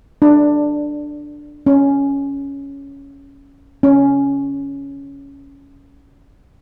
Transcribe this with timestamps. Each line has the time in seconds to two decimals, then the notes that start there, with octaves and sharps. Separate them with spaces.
0.22 D4
1.66 C#4
3.83 C#4